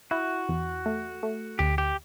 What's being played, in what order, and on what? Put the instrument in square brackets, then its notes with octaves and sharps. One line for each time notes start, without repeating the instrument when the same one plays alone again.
[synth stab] E4 [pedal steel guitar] F#4
[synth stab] E2
A3
A3
[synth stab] D2 [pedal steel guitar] G4
[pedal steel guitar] G4